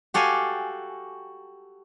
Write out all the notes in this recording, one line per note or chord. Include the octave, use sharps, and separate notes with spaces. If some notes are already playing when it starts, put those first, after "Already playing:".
F#4 G4 A4 F5 G#5